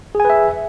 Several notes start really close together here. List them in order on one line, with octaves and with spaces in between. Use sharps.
G#4 G#5 B4 E5